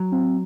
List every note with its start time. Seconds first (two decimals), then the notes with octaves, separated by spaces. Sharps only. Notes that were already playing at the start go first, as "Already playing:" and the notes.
Already playing: F#3
0.12 C4